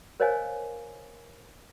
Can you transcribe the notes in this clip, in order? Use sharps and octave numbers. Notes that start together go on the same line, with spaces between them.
A#4 C5 C#5 D#5 F5 G#5